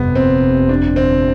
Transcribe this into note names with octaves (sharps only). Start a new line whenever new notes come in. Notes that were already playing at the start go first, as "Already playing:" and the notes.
Already playing: G1 F2 C3 B3
C4
D4
C4